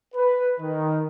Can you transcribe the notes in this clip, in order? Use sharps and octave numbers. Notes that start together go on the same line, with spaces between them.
B4
D#3